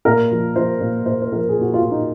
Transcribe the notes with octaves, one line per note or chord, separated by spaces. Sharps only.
A#2 A#4
F3
F3 C5
A#2
A#2 C5
C5
F3 A#4
G#4
A#2 F#4
F4
A#2
D#4